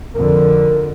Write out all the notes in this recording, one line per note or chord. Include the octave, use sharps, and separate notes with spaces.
F2 D3 A#4